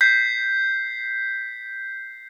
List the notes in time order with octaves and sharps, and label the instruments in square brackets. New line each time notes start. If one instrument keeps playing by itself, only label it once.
[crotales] G6 B6 C7